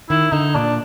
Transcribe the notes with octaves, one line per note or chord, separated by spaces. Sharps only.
D#3 E4
D3 D#4
A#2 D4